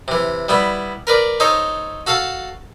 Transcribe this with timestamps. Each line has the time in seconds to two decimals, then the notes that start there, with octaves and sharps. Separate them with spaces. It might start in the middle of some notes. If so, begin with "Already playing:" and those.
0.08 C3 E3
0.49 G3 B3 E4
1.07 A#4 B4 D5
1.40 D#4 A4 C5 C#5 D#5
2.07 F#4 A4 F5 A5